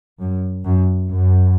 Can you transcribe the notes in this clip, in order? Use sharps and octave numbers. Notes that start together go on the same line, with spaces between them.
F#2
F#2
F#2